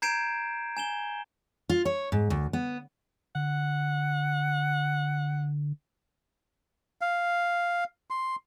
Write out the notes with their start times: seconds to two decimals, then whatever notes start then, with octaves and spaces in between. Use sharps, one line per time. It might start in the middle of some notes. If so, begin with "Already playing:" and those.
0.02 A#5 G6 G#6 C7 D7 E7
0.77 G#5 E7 G7
1.70 F4
1.85 C#5
2.12 G#2
2.30 D2
2.53 B3
3.35 D3 F#5
7.01 F5
8.10 C6